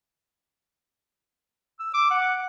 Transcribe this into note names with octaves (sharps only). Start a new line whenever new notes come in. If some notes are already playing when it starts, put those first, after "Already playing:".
E6
D6
F#5